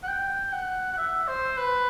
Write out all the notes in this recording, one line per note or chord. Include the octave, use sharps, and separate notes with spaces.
F#5
G5
F#5
F#5
E5
C5
B4